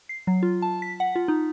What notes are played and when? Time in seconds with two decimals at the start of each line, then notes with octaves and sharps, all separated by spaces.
0.09 C7
0.27 F#3
0.43 F4
0.62 A5
0.82 B6
1.00 F#5
1.16 F4
1.28 D#4